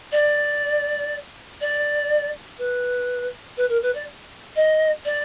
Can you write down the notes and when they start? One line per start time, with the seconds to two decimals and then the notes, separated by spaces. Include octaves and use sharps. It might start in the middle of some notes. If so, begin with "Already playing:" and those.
0.12 D5
1.61 D5
2.58 B4
3.57 B4
3.69 A#4
3.82 B4
3.94 D5
4.56 D#5
5.05 D5